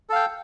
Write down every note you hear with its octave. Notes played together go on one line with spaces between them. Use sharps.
A4 F5 G5